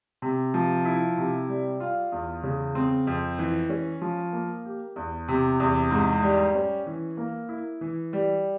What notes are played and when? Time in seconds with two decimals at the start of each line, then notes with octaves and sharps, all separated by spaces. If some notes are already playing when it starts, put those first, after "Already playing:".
0.22 C3
0.54 F3
0.85 E4
1.18 C3
1.49 G3
1.80 F4
2.12 E2
2.43 C#3
2.75 C4
3.07 F2
3.39 E3
3.69 C#4
4.01 F3
4.33 A#3
4.65 G4
4.96 E2
5.28 C3
5.60 E2
5.91 G#2
6.23 G3
6.55 C#4
6.87 E3
7.17 A#3
7.49 E4
7.81 E3
8.13 G3